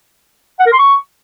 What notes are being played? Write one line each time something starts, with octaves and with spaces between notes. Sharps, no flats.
F#5
A#4
C6
C#6